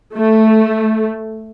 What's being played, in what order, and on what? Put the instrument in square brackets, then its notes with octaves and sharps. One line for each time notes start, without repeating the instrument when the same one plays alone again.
[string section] A3